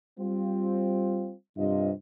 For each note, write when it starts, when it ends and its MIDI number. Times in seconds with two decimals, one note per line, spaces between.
0.19 1.33 55
0.19 1.33 60
0.19 1.33 65
1.56 1.91 43
1.56 1.91 48
1.56 1.91 65
1.56 1.91 75